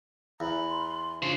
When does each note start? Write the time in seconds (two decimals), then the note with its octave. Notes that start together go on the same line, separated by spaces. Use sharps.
0.40 E2 A#5 B5
0.68 C6
1.22 C#3 D4 F4 C5